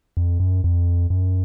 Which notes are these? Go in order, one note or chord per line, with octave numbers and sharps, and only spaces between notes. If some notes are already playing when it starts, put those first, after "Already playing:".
F2
F#2
F2
F#2